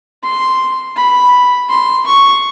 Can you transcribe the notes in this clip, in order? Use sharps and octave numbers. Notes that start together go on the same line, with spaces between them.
C6
B5
C6
C#6